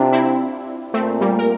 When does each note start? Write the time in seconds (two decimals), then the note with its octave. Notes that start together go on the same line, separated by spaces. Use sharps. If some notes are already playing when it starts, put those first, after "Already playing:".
Already playing: C3 D4 E4 F4 G4
0.13 C4 E4
0.94 A#2 A3 C4
1.21 G3 A#3
1.39 A#4